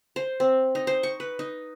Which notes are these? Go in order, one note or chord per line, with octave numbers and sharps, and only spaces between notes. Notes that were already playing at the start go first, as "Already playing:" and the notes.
C5
C4
D#4
C5
C#6
B4
D#4